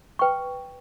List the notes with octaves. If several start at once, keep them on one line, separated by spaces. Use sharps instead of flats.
B4 G5 C#6